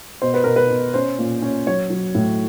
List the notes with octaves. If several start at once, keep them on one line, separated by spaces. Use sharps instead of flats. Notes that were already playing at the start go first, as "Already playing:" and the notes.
B2 C5
B4
B2 A#4
B4
B2
C#4 C5
A#2
C#4
F#3 C#5
F#3
A2